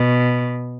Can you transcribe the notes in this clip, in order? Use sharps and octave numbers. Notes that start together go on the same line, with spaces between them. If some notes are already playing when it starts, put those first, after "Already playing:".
Already playing: B2